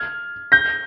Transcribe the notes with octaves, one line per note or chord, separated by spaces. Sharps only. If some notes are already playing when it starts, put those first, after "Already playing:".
Already playing: F6 G#6
G6 A#6